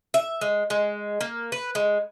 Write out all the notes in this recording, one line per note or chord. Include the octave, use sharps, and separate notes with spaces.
E5
G#3
G#3
A#3
B4
G#3